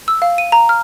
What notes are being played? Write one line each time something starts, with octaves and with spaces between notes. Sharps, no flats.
E6
F5
D#7
A#5
F6